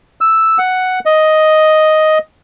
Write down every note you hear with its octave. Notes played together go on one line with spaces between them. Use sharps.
E6
F#5
D#5